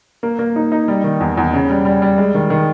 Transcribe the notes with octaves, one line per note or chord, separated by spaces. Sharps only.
A#3
A#3
D#4
D#4
G3
D#3
E2
E2
C#3
G3
G3
G3
G#3
D#3
D#3